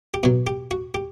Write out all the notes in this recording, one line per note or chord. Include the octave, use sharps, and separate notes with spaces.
G4
B2 F#3 F#4
G4
F#4
G4